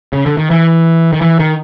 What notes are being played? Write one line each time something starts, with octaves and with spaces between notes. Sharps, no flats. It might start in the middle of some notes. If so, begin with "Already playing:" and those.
C#3
D3
D#3
E3
D#3
E3
D#3